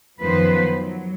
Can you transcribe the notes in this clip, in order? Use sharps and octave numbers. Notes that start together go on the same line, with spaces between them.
F#2 D#3 F3 B3 B4 C5
F#3